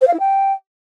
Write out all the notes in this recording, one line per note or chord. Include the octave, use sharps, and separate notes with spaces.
C5
F5
E4
G5